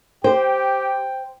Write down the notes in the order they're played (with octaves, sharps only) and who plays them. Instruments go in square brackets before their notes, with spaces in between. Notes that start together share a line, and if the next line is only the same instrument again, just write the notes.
[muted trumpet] G4 [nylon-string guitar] C5 [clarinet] G5